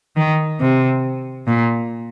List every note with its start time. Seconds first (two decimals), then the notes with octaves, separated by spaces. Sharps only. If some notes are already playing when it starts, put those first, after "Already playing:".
0.17 D#3
0.61 C3
1.47 A#2